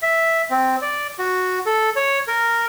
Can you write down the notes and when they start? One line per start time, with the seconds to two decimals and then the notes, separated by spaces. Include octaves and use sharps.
0.02 E5
0.51 C4
0.82 D5
1.19 F#4
1.66 A4
1.96 C#5
2.28 A#4